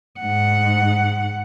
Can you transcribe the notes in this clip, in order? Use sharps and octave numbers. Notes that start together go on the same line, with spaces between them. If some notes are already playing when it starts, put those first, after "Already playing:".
G#2 F#5